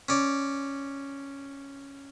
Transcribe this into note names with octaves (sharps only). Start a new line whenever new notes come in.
C#4 D5